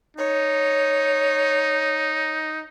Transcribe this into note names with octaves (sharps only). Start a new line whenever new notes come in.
D#4 C#5